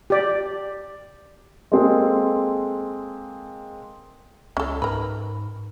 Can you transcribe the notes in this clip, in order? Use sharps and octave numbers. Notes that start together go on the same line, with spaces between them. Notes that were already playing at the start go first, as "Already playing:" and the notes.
G4 D5
G#3 A#3 C4 G#4 A4
C#2 C#4 A4
G#2 A#4 B4